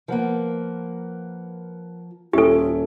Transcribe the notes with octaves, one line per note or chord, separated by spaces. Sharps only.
F3 A#3 A#4 B4 F#5
D#1 C#4 F4 G4 A4 E5